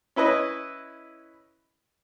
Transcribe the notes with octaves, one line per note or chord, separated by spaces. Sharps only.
C#4 E4 B4 D#5